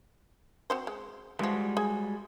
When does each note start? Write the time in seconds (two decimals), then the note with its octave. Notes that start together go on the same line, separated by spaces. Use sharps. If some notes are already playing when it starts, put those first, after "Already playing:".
0.70 C4 F#4 C5
0.87 G#3
1.39 E3 F3 G3 G#3 F#4
1.77 G#4 G#5